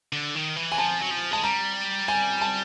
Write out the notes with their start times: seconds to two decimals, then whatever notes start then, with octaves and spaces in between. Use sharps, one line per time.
0.13 D3
0.35 D#3
0.56 E3
0.72 G#5
0.78 F3 A5
1.01 F#3
1.11 F3
1.32 G#3 A5
1.43 G3 A#5
2.08 G#5
2.41 A5